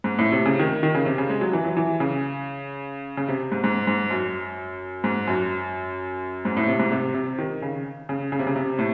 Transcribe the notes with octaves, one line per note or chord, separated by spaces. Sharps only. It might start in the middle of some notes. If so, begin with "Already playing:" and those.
G#2
A2
C3
C#3
D#3
D#3
C#3
C3
C#3
G#3
F#3
E3
F#3
E3
C#3
C#3
C3
G#2
G#2
G#2
F#2
G#2
F#2
G#2
A2
C3
G#2
C3
C3
D#3
C#3
C#3
C#3
C3
C#3
C3
A2